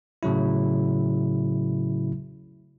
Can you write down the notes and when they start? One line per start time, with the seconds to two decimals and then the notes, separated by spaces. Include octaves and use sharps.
0.23 A2 C#3 F#3 E4